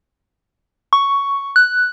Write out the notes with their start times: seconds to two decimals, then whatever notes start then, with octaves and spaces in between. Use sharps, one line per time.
0.93 C#6
1.56 F#6